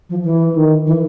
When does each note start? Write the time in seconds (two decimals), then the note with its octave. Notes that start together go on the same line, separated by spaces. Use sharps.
0.09 F3
0.24 E3
0.56 D#3
0.87 E3